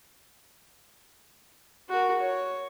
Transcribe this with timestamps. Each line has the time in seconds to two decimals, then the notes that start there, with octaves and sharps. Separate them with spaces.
1.89 F#4 A#4
2.20 C#5